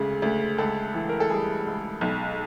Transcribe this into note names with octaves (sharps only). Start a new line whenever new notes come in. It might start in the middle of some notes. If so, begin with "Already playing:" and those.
Already playing: D2 C#3 G#3
D2
C#2 A4
E3
A#4
A4
G3 G#4
C#2
B1